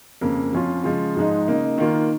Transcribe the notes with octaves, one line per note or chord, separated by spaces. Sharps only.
F2 C#3 A#3
F2 F3 C#4 F4
C#3 F3 G#3 F4
G#2 F3 G#3 D#4
C#3 A#3 D#4
D#3 A#3 F4